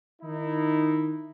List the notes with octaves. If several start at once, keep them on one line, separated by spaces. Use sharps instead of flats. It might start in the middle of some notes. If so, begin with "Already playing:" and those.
D#3 D#4 E4